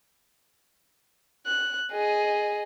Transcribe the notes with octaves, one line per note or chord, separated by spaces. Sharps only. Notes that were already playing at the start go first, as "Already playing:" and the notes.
F#6
G#4 D#5